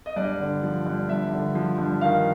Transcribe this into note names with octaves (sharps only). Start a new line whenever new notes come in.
D#5
G2 D5
D3
F3
G2
G2 E5
D3
F3
G2
D#3 F5